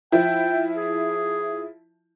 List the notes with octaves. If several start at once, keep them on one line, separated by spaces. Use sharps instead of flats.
F3 E4 G5
G#4